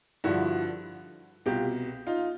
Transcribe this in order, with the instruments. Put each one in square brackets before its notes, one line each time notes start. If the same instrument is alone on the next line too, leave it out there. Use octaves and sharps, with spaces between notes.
[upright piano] G2 D3 F3 E4 F#4
C2 B2 F4 G4
D#4 F4